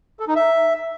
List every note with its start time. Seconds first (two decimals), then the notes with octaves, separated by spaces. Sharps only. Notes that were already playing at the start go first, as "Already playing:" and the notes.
0.20 A4
0.28 D#4
0.36 E5